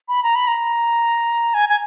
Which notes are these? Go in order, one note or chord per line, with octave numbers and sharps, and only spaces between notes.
B5
A#5
B5
A#5
G#5
G#5